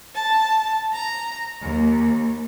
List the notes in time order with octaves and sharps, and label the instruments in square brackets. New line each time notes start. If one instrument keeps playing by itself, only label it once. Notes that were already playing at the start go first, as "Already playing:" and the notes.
[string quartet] A5
A#5
D#2